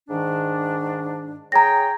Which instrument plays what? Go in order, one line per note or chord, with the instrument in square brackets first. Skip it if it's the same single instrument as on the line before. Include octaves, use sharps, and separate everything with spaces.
[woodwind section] G#2 D#3 D4
[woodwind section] G#4 C#5 G5 [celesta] A#5 A#6